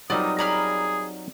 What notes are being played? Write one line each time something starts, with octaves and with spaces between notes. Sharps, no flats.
F#3 G3 C4 D#4 F4 A#4 D5 D#6
G#4 D5 A#5 B5 F6